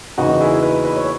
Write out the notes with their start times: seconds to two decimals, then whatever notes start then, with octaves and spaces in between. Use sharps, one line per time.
0.18 F#1 E2 C#3 E3 D#4 F#4
0.41 E4 G#4
0.62 B4 D#5
0.84 B4 D#5
0.96 C#5